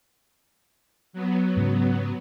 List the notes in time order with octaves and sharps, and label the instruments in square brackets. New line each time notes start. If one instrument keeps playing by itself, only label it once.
[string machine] F#3 B3
[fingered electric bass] G#2 C#3